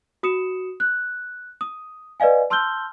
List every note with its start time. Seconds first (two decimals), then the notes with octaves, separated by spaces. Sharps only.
0.23 F#4 D#6 C#7 E7
0.80 F#6
1.61 D#6
2.20 B4 D5 D#5 F5 G#5
2.50 A5 C6 E6 F6 G6 G7